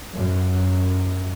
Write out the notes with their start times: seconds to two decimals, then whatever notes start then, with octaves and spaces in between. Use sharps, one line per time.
0.14 F#2